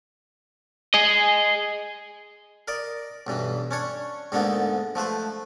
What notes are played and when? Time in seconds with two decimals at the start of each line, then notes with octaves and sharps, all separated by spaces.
0.94 G#4 D#5
2.68 A#4 D5 D#5
3.27 B1 G2 E3
3.71 C#4 D4 C#5
4.32 D2 G#2 D3 G#3 A#3 B3
4.95 F3 A3 B4 C5